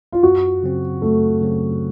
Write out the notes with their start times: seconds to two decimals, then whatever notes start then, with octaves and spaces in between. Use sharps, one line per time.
0.12 F4
0.23 F#2 F#4
0.63 C#3 F#3 C4
1.02 F#2 A3
1.41 C#3 F#3 C4